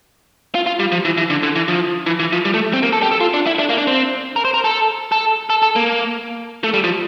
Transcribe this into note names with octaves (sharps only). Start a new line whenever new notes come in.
F4
F4
G3
F3
E3
E3
D3
D3
E3
F3
E3
E3
F3
G3
A3
C4
A#3
A4
G4
A4
F4
D4
E4
D4
A#3
D4
C4
A#4
C5
A#4
A4
A4
A4
A4
A#3
A3
G3
F3